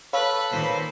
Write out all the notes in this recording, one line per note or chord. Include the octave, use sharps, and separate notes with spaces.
A4 B4 C#5 F5 B5
A#2 D#3 B4 C5